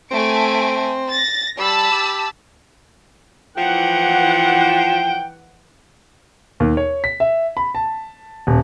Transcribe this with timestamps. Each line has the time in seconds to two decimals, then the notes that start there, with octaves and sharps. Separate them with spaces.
0.11 A3 C4 G#5 D7
1.10 A6 A#6
1.58 G3 A5 B5 E6
1.91 G4
3.57 E3 F3 F#5 G5
6.60 D#2
6.77 C#5
7.04 B6
7.20 E5
7.57 B5
7.75 A5
8.47 D#1